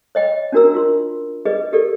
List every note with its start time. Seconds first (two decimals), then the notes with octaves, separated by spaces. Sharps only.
0.15 C#5 D#5 G5 B5
0.52 C#4 D4 F#4 A#4 A#5 E6
0.74 F4 C6
1.45 G#4 B4 D5 D#5
1.73 G4 A4 A#4 D5